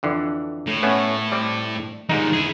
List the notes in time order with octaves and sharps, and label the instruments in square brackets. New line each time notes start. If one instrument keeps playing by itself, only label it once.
[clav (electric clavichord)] F2 D3 E3
[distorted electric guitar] A2
[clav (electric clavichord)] A3 B3 C#4
G3 C4 D5
[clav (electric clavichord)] G#2 D#4 [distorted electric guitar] D#3 G3
[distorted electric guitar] E4 G#4